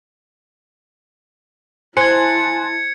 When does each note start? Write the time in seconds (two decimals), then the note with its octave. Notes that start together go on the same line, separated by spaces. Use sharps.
1.97 E4 C5 G#5 A5 C6 F#6 G#6 C#7